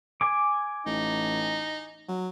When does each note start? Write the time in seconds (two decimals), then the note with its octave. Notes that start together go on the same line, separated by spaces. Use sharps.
0.21 G#5 D6
0.86 A1 D#4
2.08 F#3